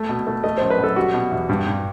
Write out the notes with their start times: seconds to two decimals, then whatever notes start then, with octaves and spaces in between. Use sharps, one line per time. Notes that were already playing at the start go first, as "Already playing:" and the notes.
Already playing: A3
0.09 B2
0.27 A3
0.44 A3 D#5
0.58 F#2 C5
0.70 B4
0.78 F#2
0.84 A4
0.96 G3 F#4
1.14 B2
1.31 E2
1.49 G2
1.67 G2